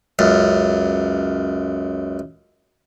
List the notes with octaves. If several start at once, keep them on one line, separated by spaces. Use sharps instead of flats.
C#2 F#2